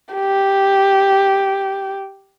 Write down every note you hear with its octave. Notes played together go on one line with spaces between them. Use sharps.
G4